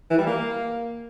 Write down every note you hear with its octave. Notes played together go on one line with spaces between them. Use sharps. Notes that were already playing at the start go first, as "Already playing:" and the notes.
E3
G3
A#3